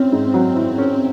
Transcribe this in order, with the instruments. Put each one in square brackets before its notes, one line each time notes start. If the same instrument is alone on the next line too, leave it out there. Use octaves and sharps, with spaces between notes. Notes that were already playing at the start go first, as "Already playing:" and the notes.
Already playing: [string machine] C4 [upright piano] C#4 E4
[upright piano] G#2
F#3
E4
C#4